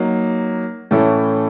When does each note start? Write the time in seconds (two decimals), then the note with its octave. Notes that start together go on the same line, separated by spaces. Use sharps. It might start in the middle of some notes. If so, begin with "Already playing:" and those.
Already playing: F#3 A#3 D#4
0.91 A2 E3 A3 C#4 E4